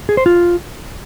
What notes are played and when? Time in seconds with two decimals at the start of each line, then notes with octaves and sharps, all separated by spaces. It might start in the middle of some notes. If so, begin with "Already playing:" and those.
0.09 G#4
0.17 C5
0.26 F4